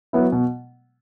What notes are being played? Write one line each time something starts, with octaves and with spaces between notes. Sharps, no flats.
F#3 B3 E4
B2